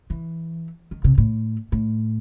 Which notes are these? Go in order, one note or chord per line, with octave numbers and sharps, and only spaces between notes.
E3
D#3
C3
A2
A2